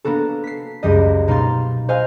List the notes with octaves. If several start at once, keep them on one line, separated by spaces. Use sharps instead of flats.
A#3 B3 D4 F#4 A4
B6 C7
C#2 F#2 G3 D#5
B2 A#3 D#4 F5 C6 A6
F#4 C5 D#5 F5 G#5